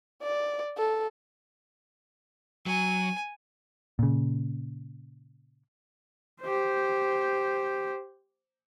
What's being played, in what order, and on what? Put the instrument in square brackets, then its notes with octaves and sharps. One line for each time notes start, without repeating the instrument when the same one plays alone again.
[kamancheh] D5
A4
[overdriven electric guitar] F#3 [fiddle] G#5
[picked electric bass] A#2 C#3
[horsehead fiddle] G4 C5